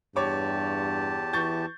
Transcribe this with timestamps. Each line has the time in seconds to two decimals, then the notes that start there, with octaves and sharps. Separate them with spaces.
0.16 E2 G2 G4 C#5 A5 D6
1.33 E3 C#6 G6 A6